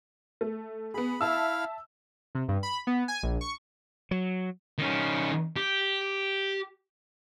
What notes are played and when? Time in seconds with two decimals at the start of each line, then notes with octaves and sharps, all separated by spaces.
0.41 A3
0.94 B3 G#4 B5
1.21 E4 E5 F5 A5 E6
2.35 C3
2.48 G2
2.63 B5
2.87 B3
3.08 G#5
3.23 A#1
3.41 C#6
4.11 F#3
4.78 D#3 C#4
5.56 G4